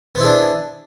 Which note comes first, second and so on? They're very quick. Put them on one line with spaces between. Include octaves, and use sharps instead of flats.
B3 C5 E4 G#4 D4